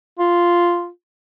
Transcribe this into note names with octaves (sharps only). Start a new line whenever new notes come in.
F4